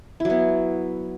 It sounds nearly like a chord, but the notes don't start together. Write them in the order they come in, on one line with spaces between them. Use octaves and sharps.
E4 F#3 B3